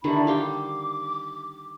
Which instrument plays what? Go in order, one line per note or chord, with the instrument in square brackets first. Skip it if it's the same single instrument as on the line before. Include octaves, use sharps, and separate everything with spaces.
[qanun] D3 D#3 G3 [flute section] D4 E4 B5
[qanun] G3 F5 G5 [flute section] D6